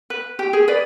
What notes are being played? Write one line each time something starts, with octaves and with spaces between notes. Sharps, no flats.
B4
G4
G#4
B4 D5